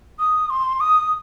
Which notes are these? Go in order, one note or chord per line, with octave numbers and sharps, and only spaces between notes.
D#6
C6
D#6